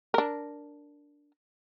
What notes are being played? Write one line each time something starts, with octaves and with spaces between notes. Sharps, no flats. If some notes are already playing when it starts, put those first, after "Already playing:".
D4 A#4